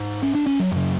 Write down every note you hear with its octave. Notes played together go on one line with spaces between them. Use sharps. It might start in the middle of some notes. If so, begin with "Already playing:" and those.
Already playing: G#2
C#4
D4
C#4
F#3
F#2 C#3 F#3